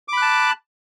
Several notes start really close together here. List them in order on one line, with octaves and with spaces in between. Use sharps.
D6 B5 F#6 A5